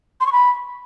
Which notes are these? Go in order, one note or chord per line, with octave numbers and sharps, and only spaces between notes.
C6
C#6
B5